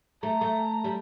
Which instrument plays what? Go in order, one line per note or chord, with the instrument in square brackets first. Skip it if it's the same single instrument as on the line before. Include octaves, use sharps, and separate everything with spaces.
[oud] A3 [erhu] A#5
[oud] A3
G3